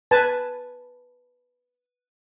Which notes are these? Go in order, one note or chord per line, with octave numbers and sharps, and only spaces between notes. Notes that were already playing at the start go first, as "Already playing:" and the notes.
B4 G#5 A5